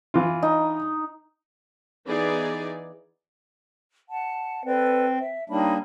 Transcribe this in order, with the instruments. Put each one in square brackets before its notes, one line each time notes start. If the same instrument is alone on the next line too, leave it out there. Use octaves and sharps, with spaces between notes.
[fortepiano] E3 F4
[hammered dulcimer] D#4
[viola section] E3 B3 D#4 G#4 D5
[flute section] F#5 A5
[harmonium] C4 [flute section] A4 B4 D5
[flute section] E5
[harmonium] G3 A#3 D4 [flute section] D#4 C#5 B5